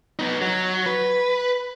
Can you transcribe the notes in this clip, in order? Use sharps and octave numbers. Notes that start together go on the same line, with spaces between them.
B3 D#4
F#3
B4